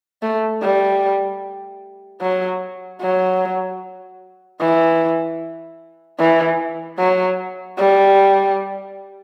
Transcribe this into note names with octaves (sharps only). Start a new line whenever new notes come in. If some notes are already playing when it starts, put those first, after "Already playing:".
A3
G3
F#3
F#3
E3
E3
F#3
G3